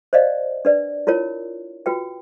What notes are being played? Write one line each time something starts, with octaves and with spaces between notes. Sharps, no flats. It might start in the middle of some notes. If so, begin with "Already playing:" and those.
C5 D5 D#5 F5
D4 B4 D5
E4 F4 A#4 C#5
F4 F#4 B4 G5